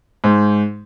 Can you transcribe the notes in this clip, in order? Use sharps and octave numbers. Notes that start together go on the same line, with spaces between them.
G#2